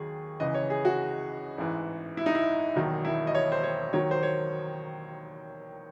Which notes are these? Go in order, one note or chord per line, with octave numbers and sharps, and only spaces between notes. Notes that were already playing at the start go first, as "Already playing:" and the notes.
Already playing: D#2 D#3 F#3 G#4
C#2 C#3 E3 D#5
C#5
G#4
F#4
A1 G#2 E3
E4
D#4
E4
E1 D#2 D#3 F#3
E4
D#5
C#5
C5
C#5
D#2 D#3 F#3 C#5
C5
C#5